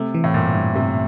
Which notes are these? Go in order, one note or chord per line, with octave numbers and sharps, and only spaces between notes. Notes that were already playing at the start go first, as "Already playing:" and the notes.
Already playing: C3 A3
E3
A2
G2 A#2
G2
G2 C3